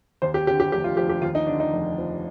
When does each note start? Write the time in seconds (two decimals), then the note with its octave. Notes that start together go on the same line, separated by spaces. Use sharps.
0.22 D#2 C5
0.34 G4
0.47 D3 G4
0.60 G4
0.72 F1 G4
0.84 F4
0.97 F3 G4
1.09 G4
1.22 D#2 F4
1.35 D#4
1.47 D3 D4
1.60 D#4
1.73 F1
1.98 F3